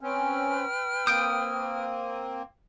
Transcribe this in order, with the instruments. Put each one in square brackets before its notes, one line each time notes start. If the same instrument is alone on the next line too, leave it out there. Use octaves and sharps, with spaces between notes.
[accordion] C4 C#4 [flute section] B4 G5 F6
[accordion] A#3 C4 [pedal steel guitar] D#6 [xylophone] G6 D7